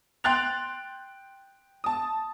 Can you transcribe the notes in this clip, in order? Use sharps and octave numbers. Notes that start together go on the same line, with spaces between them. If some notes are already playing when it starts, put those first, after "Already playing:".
G5 C6 F#6 A6 F7
A5 D#6